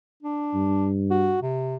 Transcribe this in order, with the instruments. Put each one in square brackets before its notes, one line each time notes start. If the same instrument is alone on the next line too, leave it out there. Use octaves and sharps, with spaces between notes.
[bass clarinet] D4
[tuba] G2
[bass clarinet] F#4
C3